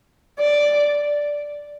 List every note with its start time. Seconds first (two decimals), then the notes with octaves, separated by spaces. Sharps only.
0.40 D5